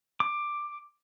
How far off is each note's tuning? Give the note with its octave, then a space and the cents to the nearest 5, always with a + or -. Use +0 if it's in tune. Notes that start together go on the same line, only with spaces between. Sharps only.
D6 +10